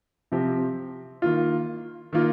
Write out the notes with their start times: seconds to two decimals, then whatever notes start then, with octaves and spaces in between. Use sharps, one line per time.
0.32 C3 F3 C4 G4
1.22 D#3 A#3 F4
2.13 D#3 A#3 F4